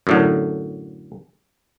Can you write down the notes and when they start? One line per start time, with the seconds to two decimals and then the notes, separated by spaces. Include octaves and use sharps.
0.07 F#2 A2 D3